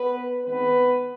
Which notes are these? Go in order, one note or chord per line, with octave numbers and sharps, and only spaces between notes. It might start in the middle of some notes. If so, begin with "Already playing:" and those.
Already playing: B3 B4
D#3 G#3 B3 C4 B4